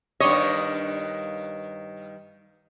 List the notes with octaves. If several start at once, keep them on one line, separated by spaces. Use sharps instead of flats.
G2 D#3 C#5 D#5